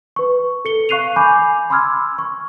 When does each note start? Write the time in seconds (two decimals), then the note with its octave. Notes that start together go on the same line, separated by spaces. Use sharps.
0.16 B4 C#6
0.65 A4 C#7 G7
0.89 F5 C#6 F#6 C7 D#7 F7
1.16 G#5 B5 D6 G6
1.70 B5 C6 D6 E6 F6 G#6
2.18 C#6